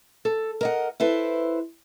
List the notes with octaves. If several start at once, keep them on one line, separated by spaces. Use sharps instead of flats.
A4
A#4 D#5 F#5
E4 A4 B4 C5